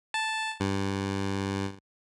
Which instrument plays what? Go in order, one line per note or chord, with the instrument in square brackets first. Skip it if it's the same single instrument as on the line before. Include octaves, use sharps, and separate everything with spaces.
[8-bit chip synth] A5
G2